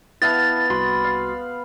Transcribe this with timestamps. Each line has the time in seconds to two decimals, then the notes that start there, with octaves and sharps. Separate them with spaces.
0.22 B3 E4 E5 F5 A5 A6
0.70 C2 F#4 B5 C6
1.04 F5